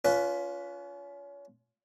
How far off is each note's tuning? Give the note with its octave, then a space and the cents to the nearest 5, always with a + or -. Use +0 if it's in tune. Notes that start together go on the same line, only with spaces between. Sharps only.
C#4 +35 F4 +0 B4 +0